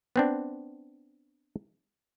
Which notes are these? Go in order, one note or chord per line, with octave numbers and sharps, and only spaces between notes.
B3 C4 D4